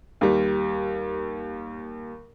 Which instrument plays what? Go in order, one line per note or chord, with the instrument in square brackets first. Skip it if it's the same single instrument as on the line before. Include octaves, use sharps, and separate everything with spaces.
[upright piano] D#2 G3